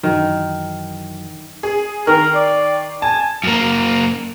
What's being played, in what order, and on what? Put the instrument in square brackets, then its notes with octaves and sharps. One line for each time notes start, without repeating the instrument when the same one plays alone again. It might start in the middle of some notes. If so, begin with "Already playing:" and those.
[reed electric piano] F#2 E3 F#3 [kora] D#3
[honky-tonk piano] G#4
[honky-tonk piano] D#3 [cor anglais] A#4
[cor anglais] D5
[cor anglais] G#5 [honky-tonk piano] A5
[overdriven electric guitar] F#2 A#3